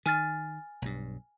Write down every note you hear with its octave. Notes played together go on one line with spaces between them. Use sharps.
D#3 G#5 F6 A6
B1 G2